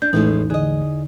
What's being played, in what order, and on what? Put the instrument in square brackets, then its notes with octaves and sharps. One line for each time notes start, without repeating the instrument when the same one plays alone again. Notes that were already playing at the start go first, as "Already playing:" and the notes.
[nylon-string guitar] D4 [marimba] G6
[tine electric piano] A1 [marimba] E2 D#4 [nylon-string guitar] A2 G#3 A3
[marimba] D3 [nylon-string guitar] G#4 D#5